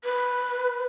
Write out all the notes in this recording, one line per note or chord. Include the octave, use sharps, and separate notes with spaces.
B4